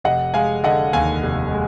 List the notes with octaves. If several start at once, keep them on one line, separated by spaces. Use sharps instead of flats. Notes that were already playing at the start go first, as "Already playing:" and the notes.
F1 D#5 F#5
G#3 F5 G#5
D3 D#5 F#5
D#2 F5 G#5
F1
G#3